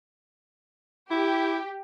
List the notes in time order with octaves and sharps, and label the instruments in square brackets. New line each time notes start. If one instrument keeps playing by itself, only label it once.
[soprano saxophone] E4 [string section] G4